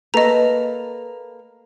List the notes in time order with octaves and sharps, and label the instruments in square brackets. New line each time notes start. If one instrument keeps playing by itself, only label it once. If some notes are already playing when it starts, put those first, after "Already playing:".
[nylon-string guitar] A#3 A4 B4 [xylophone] D#5 A#5